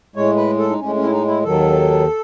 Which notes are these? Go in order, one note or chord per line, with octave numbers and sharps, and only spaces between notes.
A2 G#3 C#5
B4
A4
D#4
A2 G#3 C#4
C#4
E4
D#4
E4
D#2 D#3 F#3 A4